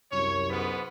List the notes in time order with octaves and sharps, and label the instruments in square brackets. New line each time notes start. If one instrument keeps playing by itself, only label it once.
[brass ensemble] C2 F#2 [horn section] C#5
[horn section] G#2 B3